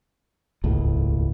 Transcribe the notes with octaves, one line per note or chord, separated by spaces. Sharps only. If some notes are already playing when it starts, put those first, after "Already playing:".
D#1 G#1 C#2 A2